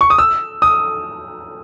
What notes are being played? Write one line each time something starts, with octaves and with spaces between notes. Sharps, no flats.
C#6
D#6
E6
D#6